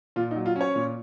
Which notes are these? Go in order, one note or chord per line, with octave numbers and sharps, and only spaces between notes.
A#2 F4
D#4
F#3
F4
C#4 C#5
A#2